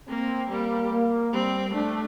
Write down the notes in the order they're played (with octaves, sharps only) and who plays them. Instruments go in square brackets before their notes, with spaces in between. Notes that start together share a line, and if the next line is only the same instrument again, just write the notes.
[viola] A#3 [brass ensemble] C4
[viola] G3 [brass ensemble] A#3
[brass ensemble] A#3
[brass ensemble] G3 [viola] C4
[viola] A3 [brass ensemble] D4